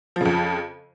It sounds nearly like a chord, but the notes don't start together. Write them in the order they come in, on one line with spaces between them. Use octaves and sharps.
F3 C#3 F2